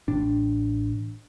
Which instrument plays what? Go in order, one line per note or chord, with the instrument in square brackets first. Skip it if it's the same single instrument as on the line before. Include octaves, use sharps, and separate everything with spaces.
[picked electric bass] A1 A2 D4